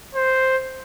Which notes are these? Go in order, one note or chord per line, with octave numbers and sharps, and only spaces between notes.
C5